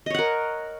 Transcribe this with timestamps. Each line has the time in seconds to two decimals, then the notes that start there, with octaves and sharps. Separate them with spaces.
0.06 D#5
0.10 C#5
0.15 F#5
0.19 A#4